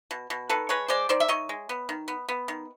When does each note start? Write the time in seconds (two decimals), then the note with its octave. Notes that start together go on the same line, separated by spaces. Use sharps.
0.11 B2
0.30 B2
0.49 D#3 A4 B4
0.69 G#3 B4 C#5
0.88 G#3 C5 D5
1.09 D#3 C5 D5
1.20 E5
1.28 D#3 C#5 D#5
1.49 G#3
1.69 B3
1.89 D#3
2.08 B3
2.28 B3
2.48 D#3